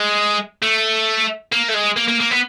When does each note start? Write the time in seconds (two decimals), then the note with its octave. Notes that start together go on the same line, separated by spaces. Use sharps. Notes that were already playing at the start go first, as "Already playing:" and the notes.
Already playing: G#3
0.62 A3
1.52 A#3
1.69 A3
1.74 G#3
1.96 A#3
2.08 A#3
2.20 A#3
2.30 B3